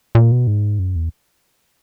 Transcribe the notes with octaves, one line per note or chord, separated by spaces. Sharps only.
A#2
B2
G#2
F#2
E2